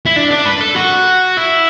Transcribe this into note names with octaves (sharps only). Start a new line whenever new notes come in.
E4
D4
D4
B4
A4
F#4
E4